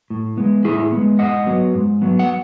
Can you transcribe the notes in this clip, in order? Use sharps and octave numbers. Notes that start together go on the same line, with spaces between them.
A2
G#3 B3
A2 E4 G#4
B3
G#3
G#2 D#5 F#5
F#3 B3
G#2
F#3 B3
F#5